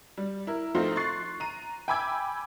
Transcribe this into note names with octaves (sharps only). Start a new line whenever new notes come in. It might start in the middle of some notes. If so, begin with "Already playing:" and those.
G3
E4 A#4
F3 A3 C4 D#4 F4
C6 C#6 F#6 A6 C7
A#5 D#7
G5 G#5 B5 D6 E6 G#6